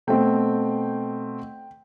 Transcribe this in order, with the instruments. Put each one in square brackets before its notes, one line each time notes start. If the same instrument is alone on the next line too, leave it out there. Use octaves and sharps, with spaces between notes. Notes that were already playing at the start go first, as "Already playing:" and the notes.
[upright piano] B2 A3 C4 G5